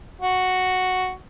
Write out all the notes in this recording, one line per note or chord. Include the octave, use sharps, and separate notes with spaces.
F#4